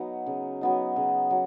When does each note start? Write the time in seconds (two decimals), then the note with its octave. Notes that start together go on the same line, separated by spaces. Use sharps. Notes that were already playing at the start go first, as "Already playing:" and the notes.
Already playing: F#3 B3 D#4
0.26 C#3
0.61 F#3 B3 D#4
0.96 C#3
1.30 F#3